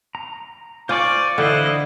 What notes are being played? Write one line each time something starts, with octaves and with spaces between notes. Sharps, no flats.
A#5
F4 C5 D5 G#5 C#6
D3 E3 E4 C5 D#5 F5